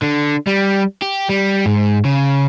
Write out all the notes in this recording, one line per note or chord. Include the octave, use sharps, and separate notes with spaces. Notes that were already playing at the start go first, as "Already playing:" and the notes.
D3
G3
G4
G3
G#2
C#3